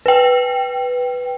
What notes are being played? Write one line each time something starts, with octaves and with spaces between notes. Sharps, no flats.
B4 G5